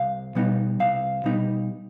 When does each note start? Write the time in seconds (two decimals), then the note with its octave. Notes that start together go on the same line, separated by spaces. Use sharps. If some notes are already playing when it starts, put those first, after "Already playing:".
Already playing: C2 F5
0.35 B2 G3 B3 D#4
0.80 C2 F5
1.24 B2 G3 B3 D#4